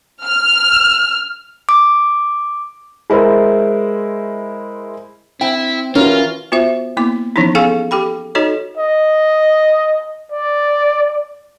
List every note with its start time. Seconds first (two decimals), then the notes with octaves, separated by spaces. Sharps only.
0.25 F6
1.69 D6
3.10 G#3 E4 A#4 C5 E5
5.41 C4 E4 G5
5.95 E3 C#4 F4 F#4 A#4
6.52 B3 F4 F#4 C5 E5
6.97 A#3 B3 E4 D6
7.36 E3 F3 B3 C#4 D#4 E4
7.55 B3 G#4 A4 F5 G#5 C#6
7.91 G4 A4 G5 B5
8.35 D#4 F#4 A4 C#5 D#5
8.77 D#5
10.32 D5